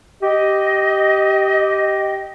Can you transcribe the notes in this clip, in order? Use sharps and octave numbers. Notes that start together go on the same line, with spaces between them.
G4 D#5